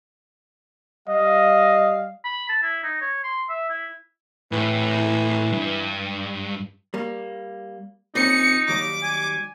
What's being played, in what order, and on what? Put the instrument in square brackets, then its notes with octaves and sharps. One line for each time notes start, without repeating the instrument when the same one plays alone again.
[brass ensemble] G3 F5 [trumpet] D#5
[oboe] B5
A5
E4
D#4
C#5
C6
E5
E4
[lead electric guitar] A2 [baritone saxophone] E3
[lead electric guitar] G2
[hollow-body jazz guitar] G3 A#3
[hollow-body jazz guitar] A#2 C4 C#4 [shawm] D#4 [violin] C#7
[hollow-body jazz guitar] D#2 F#3 G3 [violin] D6
[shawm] G#5